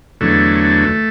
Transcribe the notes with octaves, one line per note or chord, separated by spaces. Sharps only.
E2 D3 F#3 A3